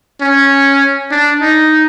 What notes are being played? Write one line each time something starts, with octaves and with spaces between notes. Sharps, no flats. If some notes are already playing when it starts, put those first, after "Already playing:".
C#4
D4
D#4